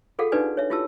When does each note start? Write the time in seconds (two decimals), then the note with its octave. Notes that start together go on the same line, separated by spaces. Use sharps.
0.19 F4 G#4 A4 F5 F#5
0.32 D4 D#4 G4 B4 D5 G#5
0.57 C#5 E5
0.70 E4 F4 G4 A5 E6